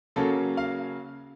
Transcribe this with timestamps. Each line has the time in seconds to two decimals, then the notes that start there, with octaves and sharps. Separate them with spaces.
0.16 C#3 F#3 A#3 C#4 A4
0.57 F5